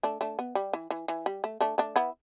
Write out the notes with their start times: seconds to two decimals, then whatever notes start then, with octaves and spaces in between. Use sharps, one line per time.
0.03 A3 D4
0.21 A3 D4
0.39 B3
0.55 G3
0.73 E3
0.90 E3
1.08 E3
1.26 G3
1.44 A3
1.61 A3 D4
1.78 A3 D4
1.96 B3 E4